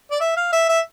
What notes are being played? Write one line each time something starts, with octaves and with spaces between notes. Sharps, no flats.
D5
E5
F5
E5
E5